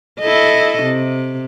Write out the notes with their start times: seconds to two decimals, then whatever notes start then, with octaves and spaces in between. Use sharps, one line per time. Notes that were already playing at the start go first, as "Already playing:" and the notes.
0.20 E4 A4 D#5
0.83 C3